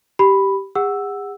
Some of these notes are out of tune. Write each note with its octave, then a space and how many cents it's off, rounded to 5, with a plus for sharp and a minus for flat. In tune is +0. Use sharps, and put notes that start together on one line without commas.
G4 -10 B5 +0
G#4 -45 F#5 +0 E6 +0